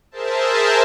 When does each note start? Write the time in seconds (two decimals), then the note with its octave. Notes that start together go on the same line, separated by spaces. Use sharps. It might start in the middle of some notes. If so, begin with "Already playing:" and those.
0.11 G#4 A#4 C5 E5 A5